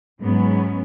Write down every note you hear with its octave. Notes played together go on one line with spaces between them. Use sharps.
G#2 F#3 B3 C#4